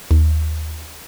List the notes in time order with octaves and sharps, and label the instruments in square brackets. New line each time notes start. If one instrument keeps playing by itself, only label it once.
[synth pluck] D#2